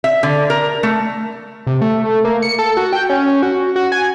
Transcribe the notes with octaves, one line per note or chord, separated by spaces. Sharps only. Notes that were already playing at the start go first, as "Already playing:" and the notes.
E5
D3
A#4
A3
C3
A3
A#3
C#7
A4
F#4
G5
C#4
F#4
F#4
G#5